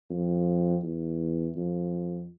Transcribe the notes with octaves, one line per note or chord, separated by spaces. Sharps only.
F2
E2
F2